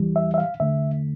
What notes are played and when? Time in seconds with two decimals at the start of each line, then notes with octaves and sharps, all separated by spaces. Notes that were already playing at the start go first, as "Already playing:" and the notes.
Already playing: E2 E3 G3
0.16 E5
0.34 E5
0.38 F5
0.59 E2 D3 A3 E5